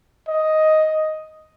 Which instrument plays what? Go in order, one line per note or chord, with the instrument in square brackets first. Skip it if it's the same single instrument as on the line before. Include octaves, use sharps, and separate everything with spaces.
[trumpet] D#5